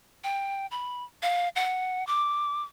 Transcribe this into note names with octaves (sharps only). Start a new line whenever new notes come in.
G5
B5
F5
F#5
D6